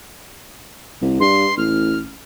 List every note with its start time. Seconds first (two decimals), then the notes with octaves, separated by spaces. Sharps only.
1.02 C2
1.20 G2 C6
1.57 A1 F6